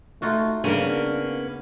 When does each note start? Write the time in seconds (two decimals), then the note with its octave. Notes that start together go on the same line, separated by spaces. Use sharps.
0.22 A3 D#4 F4 F#4
0.64 C#3 A#3 B3 C#4 D4 A#4